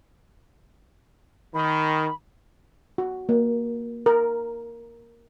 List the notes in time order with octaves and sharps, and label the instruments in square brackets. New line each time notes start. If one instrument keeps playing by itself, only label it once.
[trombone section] D#3 [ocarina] B5
[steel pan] F#4
A#3
A#4